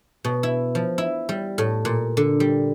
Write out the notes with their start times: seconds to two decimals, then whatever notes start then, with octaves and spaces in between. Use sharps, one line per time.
0.24 B2
0.43 E4
0.75 F3
0.98 E4
1.29 G3
1.58 A2
1.85 A#2
2.17 D3
2.40 G3